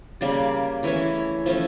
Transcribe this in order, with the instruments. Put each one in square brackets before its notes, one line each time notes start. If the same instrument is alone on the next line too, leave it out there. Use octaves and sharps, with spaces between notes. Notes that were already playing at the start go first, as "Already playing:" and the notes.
[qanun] C#3 G3 A#3 D5
E3 A3 C#4 C#5
F3 A3 C#4